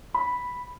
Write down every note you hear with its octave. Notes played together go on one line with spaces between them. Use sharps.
B5